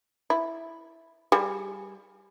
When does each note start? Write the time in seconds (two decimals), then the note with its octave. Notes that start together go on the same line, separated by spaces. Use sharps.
0.30 E4
1.32 G3 G#4